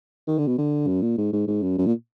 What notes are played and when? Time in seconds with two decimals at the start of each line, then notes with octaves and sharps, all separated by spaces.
0.28 D#3
0.38 D3
0.48 B2
0.58 D3
0.87 F#2
1.02 A#2
1.18 G#2
1.33 G#2
1.48 G#2
1.63 F#2
1.78 F#2
1.86 A#2